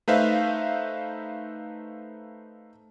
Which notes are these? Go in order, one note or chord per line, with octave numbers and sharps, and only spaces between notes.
A3 D#4 B4 C5 E5 F5